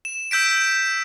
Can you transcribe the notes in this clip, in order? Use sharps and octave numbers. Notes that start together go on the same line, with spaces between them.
E7
E6 G6 B6 D7